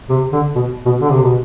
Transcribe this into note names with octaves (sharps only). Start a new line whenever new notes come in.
C3
D3
B2
B2
D3
C3
B2